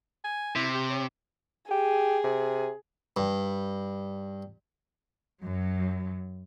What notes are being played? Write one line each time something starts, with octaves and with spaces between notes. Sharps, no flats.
G#5
C3 E4
G4
C#5
G4 G#4
C3
G2
F#2 F#3